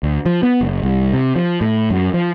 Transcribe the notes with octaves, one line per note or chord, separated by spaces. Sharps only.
D2
F3
B3
F#1
C2
C3
F3
A2
F#2
F3